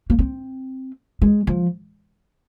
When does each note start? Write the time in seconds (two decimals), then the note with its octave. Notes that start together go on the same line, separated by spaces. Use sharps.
0.10 A#3
0.19 C4
1.22 G#3
1.47 F3